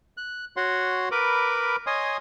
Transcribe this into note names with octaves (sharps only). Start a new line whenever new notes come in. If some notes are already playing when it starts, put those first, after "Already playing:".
F#6
F#4 C#5 F#5 C6
A#4 B4 B5 D6
C#5 D#5 G#5 C6 D#6